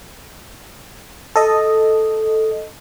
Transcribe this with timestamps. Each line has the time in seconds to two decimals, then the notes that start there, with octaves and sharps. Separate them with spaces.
1.36 A4 D#5